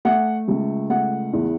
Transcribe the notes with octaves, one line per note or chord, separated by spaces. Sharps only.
A3 F#5
C#2
A3 F#5
E2